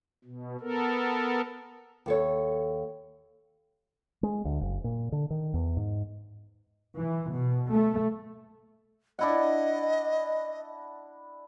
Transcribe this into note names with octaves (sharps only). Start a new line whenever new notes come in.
B2
B3 A4 A#4
D#2 A4 C#5
G#3
D2
F#1
A#2
D3
D#3
E2
G#2
E3
B2
A3
D4 E4 D#5 F#5